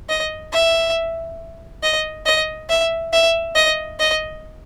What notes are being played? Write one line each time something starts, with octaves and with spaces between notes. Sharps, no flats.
D#5
E5
D#5
D#5
E5
E5
D#5
D#5